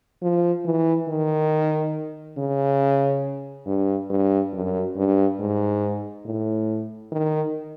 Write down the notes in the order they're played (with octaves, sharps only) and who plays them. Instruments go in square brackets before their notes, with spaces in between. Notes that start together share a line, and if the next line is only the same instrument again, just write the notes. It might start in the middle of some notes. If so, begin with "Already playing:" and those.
[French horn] F3
E3
D#3
C#3
G2
G2
F#2
G2
G#2
A2
D#3